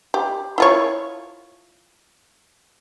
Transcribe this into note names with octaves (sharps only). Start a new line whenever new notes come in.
G4
E4 F4 C#5